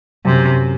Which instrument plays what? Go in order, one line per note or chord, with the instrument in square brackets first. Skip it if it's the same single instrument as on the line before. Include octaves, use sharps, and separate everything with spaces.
[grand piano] F#2 [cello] C3